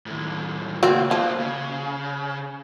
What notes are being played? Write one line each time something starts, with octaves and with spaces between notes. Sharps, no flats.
D#2 A2
C#2 F#3 A#3 C4
F3 A#3 C5
C#3